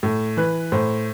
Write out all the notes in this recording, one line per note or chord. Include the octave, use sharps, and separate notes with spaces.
A2
E3 B4
A2 C5